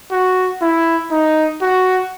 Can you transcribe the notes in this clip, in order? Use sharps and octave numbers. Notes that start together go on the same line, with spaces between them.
F#4
E4
D#4
F#4